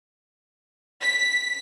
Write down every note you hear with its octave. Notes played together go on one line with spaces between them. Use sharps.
B6